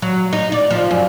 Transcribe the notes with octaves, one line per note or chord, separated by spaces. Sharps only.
F#3
D#4
D5
F3
F#2